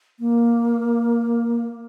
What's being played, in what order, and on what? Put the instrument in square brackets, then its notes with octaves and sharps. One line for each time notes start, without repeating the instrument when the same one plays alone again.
[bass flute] A#3